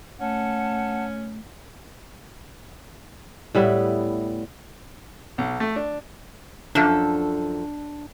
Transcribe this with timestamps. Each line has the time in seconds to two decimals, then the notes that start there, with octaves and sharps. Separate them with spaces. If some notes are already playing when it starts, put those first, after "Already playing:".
0.21 A3 C#4 F#5 A5
3.55 A2 G3 B3 E4
5.38 B1
5.60 A3
5.76 D4
6.75 F#2 F3 D4 A4